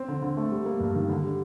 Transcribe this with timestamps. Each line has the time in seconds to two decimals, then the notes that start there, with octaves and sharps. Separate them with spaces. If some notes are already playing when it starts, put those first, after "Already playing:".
Already playing: C4
0.08 D3
0.22 D3
0.37 A3
0.51 G3
0.65 A#3
0.80 G2
0.95 D#3
1.09 D3
1.24 G3